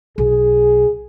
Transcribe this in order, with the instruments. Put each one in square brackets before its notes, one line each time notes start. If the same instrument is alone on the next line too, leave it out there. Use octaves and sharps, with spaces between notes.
[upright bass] B1 [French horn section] G#4